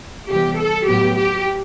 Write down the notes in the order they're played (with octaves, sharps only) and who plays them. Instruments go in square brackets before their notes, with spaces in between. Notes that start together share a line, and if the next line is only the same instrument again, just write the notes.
[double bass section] C3 E3 G3 B3 [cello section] G4
[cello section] A4
[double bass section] A2 F#3 B3 [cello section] G4
[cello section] G4